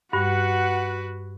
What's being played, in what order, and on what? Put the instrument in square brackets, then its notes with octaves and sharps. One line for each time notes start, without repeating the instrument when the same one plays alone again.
[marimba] G2 G3 [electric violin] F#4 B4 [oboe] F#5